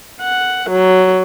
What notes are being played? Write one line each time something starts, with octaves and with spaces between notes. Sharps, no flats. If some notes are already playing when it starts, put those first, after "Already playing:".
F#5
F#3